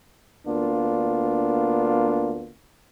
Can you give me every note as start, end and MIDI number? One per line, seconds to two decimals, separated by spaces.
0.47 2.53 38
0.47 2.53 58
0.47 2.53 59
0.47 2.53 62
0.47 2.53 65